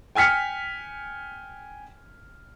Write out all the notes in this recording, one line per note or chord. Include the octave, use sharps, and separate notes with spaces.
G5 G#5 F6 B6 C#7